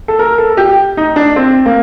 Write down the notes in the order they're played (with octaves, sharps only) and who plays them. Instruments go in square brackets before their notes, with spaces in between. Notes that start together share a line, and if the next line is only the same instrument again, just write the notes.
[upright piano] A4
A#4
A4
G4
D#4
D4
C4
A#3